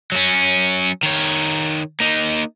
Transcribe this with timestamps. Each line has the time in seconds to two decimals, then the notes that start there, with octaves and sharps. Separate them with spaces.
0.12 F#3 C#4
1.03 D#3 C#5
2.00 A#3 D#4